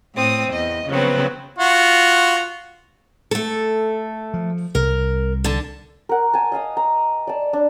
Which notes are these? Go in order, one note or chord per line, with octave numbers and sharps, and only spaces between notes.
A2 C4 D#6
E2 D#5
C#3 F3 F#3 B3 C4
F4 F#4
A3 A4
F3
C2 A#4
D3 A5
A#4 F#5
G#5 A5
D#5 F5 G#5 D#6
A#5
D5 A5
D4